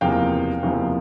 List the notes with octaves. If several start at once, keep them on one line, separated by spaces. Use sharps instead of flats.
F#1 E2 C3 F3 A#3 F5 G5
F#1 E2 C3 F3 A#3